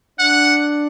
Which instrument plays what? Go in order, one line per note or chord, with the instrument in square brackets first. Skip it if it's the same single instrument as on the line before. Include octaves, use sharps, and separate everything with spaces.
[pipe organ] D4 [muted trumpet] F#5